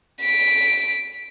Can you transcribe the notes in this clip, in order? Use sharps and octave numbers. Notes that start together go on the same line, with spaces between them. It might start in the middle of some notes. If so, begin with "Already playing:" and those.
B6 D7